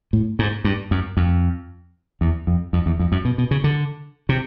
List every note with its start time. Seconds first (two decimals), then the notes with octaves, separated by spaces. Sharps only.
0.13 A2
0.39 G#2
0.64 G2
0.91 F#2
1.17 F2
2.21 E2
2.47 F2
2.73 F2
2.86 E2
2.99 F2
3.12 F#2
3.25 B2
3.38 B2
3.51 C#3
3.64 D3
4.29 C3